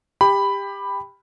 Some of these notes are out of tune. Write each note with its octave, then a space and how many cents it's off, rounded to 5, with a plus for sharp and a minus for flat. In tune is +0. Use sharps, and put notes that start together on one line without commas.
G4 +20 B5 +5